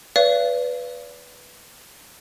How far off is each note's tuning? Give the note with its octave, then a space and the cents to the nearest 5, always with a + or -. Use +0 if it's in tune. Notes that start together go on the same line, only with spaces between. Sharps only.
B4 +0 D5 -40 F5 -35